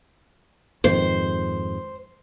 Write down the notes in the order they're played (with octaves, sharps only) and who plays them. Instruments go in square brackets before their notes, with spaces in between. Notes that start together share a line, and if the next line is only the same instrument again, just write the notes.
[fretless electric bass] F2 G#2 D#3 [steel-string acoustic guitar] C5